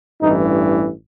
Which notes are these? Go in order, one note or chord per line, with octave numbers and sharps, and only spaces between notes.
A1 G2 E3 D#4